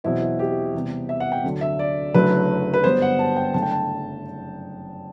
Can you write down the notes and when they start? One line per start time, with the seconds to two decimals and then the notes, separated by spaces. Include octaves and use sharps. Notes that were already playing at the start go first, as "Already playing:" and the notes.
0.04 E2 B2 F#3 C4 E4
0.21 E4
0.39 G4
0.74 E2 C3 G3 B3
1.09 E5
1.20 F#5
1.32 G5
1.44 D2 D3 F#3
1.61 E5
1.79 D5
2.14 F#1 F#2 D3 F#3 A3 B4
2.74 B4
2.84 G1 G2 F#3 B3 C5
3.02 F#5
3.19 A5
3.36 G5
3.54 F#1 F#2 D3 A3 A5
3.62 G5
3.71 A5